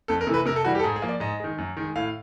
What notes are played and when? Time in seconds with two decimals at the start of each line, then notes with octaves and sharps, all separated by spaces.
0.08 F2 A4
0.21 A#4
0.27 C3 E3 A3
0.34 B4
0.46 C3 A#4
0.56 A4
0.65 E3 G3 F#4
0.75 G4
0.79 A4
0.83 G#2 G#4
0.96 G#4
1.02 F3 A#3
1.09 D5
1.20 G#2 D#5
1.40 D#3 G#3
1.58 F#2
1.77 D#3 G#3
1.96 A2 F5